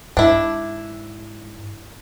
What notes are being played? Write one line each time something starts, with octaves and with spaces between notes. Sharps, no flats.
G#2 D4 E4